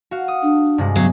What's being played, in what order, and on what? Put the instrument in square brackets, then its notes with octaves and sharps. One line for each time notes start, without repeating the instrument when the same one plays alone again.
[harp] F#4 F5
D#6
[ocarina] D4
[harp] G2 C3 G#3
[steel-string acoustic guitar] C#3 F#3 [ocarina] B3